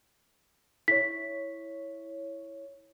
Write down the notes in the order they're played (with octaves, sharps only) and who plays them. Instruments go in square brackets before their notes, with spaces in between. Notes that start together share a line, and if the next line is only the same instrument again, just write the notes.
[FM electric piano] E4 C#5 [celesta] B6